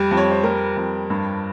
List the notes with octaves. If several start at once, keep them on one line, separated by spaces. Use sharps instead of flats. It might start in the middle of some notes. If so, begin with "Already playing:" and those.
Already playing: F2 G3
F2
C#5
C5
G3 A#4
F2
G2